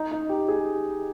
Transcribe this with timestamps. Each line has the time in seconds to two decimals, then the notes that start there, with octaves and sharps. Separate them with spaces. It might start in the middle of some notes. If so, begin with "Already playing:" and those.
Already playing: D#4
0.11 D#4
0.29 G4
0.48 G#4